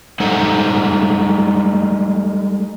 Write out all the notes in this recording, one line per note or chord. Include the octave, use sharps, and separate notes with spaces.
G3 G#3 D#4 A4 C5 F#5